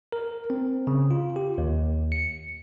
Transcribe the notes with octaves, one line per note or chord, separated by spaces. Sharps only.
A#4
C4
C#3
F4
G4
D#2
C#7